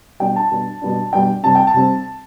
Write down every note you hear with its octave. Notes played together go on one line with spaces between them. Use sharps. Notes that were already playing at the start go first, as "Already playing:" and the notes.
B2 G3 B3 D4 G5
A5
B2 G3 B3 D4
B2 G3 B3 D4
B2 G3 B3 D4 G5
C3 G3 C4 A5
G5
A5
C3 G3 C4